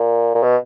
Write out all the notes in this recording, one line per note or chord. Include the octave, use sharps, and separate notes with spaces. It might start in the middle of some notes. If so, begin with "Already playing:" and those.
Already playing: A#2
A#2
B2